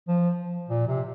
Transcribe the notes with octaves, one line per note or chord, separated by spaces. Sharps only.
F3
A#2
C3